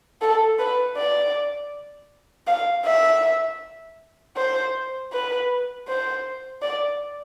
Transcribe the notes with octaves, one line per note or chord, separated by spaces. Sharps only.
A4
B4
D5
F5
E5
C5
B4
C5
D5